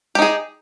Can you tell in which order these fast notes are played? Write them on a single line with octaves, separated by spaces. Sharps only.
G4 D#4 G#4